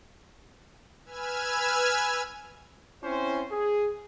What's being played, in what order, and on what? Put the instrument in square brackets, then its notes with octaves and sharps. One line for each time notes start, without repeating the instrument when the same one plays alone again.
[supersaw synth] B4 G#5 E6 F6 G#6
[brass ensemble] C4 C#4 E4 C5
G#4